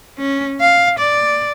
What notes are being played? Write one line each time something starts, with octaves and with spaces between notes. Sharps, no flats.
C#4
F5
D5